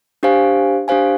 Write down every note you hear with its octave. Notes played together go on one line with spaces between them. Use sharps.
D4 G4 C5 F5 G#5
D4 G4 C5 F5 G#5